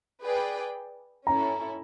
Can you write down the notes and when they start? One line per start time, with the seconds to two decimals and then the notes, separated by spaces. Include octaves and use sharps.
0.22 G#4 B4 D5 G5
1.27 C#4 E4 A4 A#5